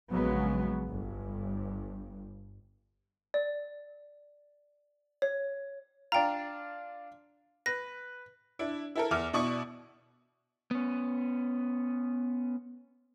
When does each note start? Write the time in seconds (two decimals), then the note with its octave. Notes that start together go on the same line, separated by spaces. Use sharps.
0.12 A#1 C#3 F#3 G#3 B3
0.90 G1 G2
3.34 D5
5.22 C#5
6.12 D4 F4 G5 A#5
7.66 B4 A#6
8.59 D4 E4
8.95 E4 A4 A#4
9.11 E2 E5 D6 F6
9.33 B2 E4 D5 C#6 D#6
10.71 B3 C#4